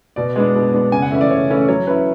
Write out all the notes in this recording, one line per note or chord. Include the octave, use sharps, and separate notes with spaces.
B2 D5
G#3 B3 D4
B2
G#3 B3 D4
C#3 G#5
F#5
E3 A3 C#4 E4 E5
D5
C#3 C#5
E3 A3 C#4 E4
F#3 C#5
C#4 E4 B4